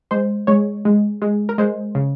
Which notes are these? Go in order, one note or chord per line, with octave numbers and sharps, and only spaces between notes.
G#3 C5
G#3 C#5
G#3
G#3
A#4
G#3 C5
C#3